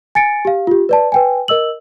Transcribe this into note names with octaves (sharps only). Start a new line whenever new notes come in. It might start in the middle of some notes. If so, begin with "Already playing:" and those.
G#5 A6 C#7 D7
G4 F5
F4 G4
B4 D5 A5
B4 G5 G#5
A#4 D#5 E6 F#7